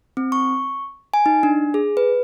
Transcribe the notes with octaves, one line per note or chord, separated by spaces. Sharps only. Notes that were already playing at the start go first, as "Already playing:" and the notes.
C4
C#6
G#5
D#4
D4
G#4
B4